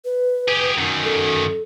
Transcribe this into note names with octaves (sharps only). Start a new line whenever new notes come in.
B4
G4 G#4
F#2 D#3
A4